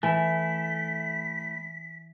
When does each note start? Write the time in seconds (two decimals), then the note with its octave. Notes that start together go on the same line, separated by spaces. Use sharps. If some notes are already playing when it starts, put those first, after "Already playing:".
0.03 E3 A3 E4 G#5 B6